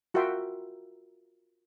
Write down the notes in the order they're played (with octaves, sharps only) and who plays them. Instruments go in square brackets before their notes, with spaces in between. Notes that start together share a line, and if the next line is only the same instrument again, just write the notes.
[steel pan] F4 F#4 A#4 E5 G5 C6